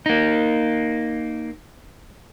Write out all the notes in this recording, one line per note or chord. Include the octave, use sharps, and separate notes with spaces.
A#3 D#4